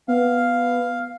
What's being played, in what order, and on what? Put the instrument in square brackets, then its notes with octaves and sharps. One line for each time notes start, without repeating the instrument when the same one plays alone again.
[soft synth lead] B3 [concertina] F5